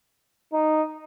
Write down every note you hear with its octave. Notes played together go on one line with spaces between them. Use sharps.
D#4